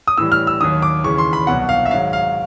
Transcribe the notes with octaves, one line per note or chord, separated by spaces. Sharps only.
D#6
A2 E3 G3 E6
F6
E6
D#2 D#3 F#3 D#6
D6
D#2 C#3 E3 C#6
C6
B5
C2 B2 F#3 F#5
F5
E5
G#2 D#3 F#3 F5
F5